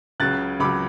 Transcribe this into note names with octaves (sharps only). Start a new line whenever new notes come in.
C#2 C#3 F#3 F#6 A6
C#2 C#3 F#3 B5 D6